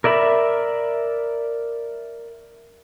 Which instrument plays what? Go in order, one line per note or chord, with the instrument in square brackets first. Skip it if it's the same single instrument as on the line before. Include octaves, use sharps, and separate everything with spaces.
[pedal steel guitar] A#4 D5 E5 B5